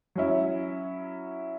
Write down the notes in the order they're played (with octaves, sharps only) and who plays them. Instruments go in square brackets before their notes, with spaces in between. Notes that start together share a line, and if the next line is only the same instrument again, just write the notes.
[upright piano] F#3 C#4 E4